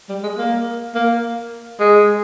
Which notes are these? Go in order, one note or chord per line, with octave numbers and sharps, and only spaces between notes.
G3
G#3
A#3
A#3
G#3